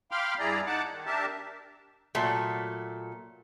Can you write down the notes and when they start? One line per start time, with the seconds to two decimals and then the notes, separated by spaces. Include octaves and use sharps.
0.11 F5 G5 B5 C6 D6 F6
0.39 G2 E4 G#4 D5 A#5
0.66 D#4 F#5 A5 D6
0.92 D#3
1.06 D4 G4 A#4 E5 A5
2.15 A#2 F#3 A3